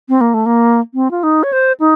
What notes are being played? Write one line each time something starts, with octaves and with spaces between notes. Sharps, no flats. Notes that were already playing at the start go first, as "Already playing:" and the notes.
C4
A#3
A3
A#3
C4
F4
D#4
C#5
C5
D#4